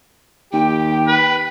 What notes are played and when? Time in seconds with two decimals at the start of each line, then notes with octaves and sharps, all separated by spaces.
0.53 D#2 G4 G5
1.08 B4